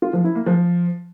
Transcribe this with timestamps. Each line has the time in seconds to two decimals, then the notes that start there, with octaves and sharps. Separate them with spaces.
0.02 F4
0.13 F3
0.24 E4
0.35 A#3
0.46 F3